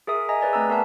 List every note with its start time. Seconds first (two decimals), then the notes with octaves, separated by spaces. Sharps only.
0.07 G#4 A#4 E5 D#6
0.29 D#5 E5 G#5 A#5
0.41 G#4 B4 D5 G#5
0.53 A3 C4 A#5 E6
0.69 B3 A#4 E5 A5